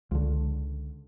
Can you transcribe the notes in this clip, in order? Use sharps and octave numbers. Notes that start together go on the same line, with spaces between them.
C#2 D3